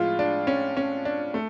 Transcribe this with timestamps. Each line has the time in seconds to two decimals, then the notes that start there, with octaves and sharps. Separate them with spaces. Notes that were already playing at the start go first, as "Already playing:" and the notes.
Already playing: A2 F3 G#3 F4
0.19 D4
0.47 C#4
0.77 C#4
1.05 D4
1.34 A3